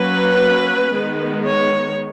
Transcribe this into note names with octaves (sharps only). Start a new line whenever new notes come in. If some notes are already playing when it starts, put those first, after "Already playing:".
Already playing: F#3 A#3 C#4 B4
D#3 G#3 B3
C#5